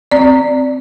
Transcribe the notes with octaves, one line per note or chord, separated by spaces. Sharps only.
C4 D5